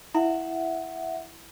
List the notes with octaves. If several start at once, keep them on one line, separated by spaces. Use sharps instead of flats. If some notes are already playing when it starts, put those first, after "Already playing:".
E4 E5 F#5